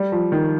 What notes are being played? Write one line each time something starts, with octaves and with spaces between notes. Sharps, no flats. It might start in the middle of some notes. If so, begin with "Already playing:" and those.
Already playing: G3
F3
D#3